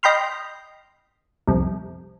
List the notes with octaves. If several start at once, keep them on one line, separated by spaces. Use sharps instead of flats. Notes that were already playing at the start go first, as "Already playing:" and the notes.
D#5 G5 B5 C6 F6
C2 F2